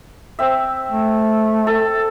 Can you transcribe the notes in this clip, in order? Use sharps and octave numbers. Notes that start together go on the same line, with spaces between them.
C4 E5
A3
A4